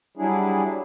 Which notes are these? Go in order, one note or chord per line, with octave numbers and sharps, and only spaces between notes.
F#3 G3 D4 E4 G#4